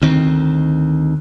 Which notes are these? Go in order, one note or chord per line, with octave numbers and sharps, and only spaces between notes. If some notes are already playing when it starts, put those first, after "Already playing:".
D2 D#3 C4